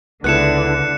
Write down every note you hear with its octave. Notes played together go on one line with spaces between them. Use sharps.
C#2 D3 B3 E4 A4 F#6 C#7 E7